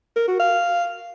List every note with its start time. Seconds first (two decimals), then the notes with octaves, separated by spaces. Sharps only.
0.16 A#4
0.28 F#4
0.40 F5